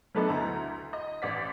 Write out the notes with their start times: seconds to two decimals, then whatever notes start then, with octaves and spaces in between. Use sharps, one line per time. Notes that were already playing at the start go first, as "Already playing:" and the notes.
0.15 F#3 A3 B3 D4 A4 D#5
0.29 D2 E4 A#5
0.93 D#5
1.22 A1 D5 B6